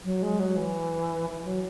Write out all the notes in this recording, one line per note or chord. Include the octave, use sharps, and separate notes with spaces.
F#3
G#3
F#3
E3
E3
F#3